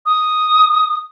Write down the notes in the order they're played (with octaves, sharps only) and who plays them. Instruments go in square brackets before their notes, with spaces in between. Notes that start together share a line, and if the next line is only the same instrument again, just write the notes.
[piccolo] D#6